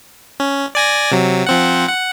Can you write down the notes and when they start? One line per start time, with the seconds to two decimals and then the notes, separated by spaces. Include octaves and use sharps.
0.40 C#4
0.75 D5 G#5 A#6
1.11 C3 F#3
1.46 F3 C4 F#5
1.89 F#5